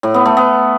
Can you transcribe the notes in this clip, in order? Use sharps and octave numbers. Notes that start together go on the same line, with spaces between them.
A2
B3
A3
B3